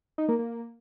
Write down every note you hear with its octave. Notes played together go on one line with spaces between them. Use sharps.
D#4
A#3
A#3